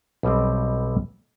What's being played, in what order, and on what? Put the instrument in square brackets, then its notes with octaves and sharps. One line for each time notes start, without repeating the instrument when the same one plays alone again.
[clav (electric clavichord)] B1 B2 G3 C4